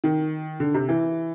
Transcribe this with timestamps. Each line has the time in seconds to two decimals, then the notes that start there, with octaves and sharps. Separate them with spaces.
0.04 D#3
0.60 D3
0.74 C3
0.89 E3